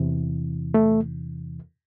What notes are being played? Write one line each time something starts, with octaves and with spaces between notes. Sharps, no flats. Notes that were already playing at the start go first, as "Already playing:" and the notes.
Already playing: E2 C3 E3
A3